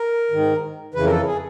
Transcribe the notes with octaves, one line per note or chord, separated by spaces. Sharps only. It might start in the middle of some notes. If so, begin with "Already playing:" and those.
Already playing: A#4
G#2 D#3
F2 C#3 E3 B4
A#4
A4
G#4